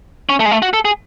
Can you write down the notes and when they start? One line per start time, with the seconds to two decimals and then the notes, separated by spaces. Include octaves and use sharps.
0.29 C#4
0.40 A3
0.46 G#3
0.51 A3
0.62 F#4
0.73 A4
0.85 G#4